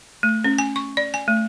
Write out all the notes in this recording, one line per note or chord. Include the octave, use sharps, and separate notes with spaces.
A3
C#4
G#5
C#6
D5
G#5
A3